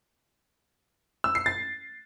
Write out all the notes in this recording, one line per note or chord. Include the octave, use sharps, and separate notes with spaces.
E6
C7
A6